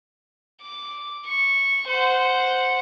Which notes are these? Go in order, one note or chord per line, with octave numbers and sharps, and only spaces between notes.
D6
C#6
C5 F#5